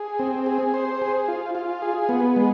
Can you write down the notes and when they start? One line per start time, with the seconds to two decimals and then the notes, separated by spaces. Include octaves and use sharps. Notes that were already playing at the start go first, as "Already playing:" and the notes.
Already playing: G#4
0.19 C4
0.46 G#4
0.74 C5
1.01 G#4
1.28 F4
1.55 F4
1.82 G#4
2.09 B3
2.36 G#3